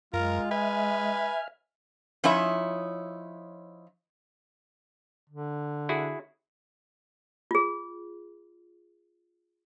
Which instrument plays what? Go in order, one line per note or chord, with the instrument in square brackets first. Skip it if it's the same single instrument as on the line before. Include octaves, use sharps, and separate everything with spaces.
[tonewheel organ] F#2 [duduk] G#3 [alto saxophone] F4 [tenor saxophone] A#4
[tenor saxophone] B4 [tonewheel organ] E5 F6 [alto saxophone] G#5
[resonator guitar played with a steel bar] F3 C#4 D#4 E4 C#5 E5
[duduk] D3
[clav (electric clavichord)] E4 F#4 G#4
[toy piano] F4 G#4